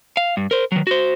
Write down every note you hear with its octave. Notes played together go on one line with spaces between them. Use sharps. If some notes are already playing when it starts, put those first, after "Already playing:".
F5
G2
A#4 C5
D#3 F#3
F#4 C5